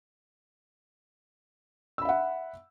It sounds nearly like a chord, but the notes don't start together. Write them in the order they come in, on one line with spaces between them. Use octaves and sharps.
E6 B5 E5 F#5